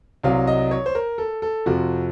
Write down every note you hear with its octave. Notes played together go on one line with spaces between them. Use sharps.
C2 C3 F#3 F5
D#5
C#5
C5
A#4
A4
A4
F2 C3 F3 F#4